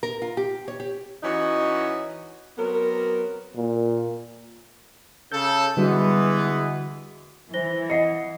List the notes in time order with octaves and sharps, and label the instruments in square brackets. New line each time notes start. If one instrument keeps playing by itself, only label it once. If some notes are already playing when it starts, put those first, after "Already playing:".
[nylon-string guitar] A#4
F4
G4
C#5
G4
[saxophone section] E3 C#4 D#4 F#4 C#5 D#5
F#3 B3 C4 A#4
[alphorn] A#2
[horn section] C#3 A4 [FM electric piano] G6
[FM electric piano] D3 G3 F#4 [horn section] E3 G#3 B3
[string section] E3 [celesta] C5 A#6 G7
[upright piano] D#5 [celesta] F#5 C7 C#7